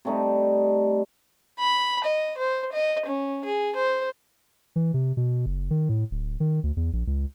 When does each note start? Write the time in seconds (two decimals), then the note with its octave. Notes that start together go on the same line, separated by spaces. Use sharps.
0.05 C3 G3 A3 D#4
1.59 B5
2.05 D#5
2.38 C5
2.73 D#5
3.06 C#4
3.45 G#4
3.75 C5
4.76 E3
4.94 C3
5.17 B2
5.46 F#1
5.70 D#3
5.89 A2
6.11 D1
6.40 D#3
6.63 D2
6.77 E2
6.93 A#1
7.07 C#2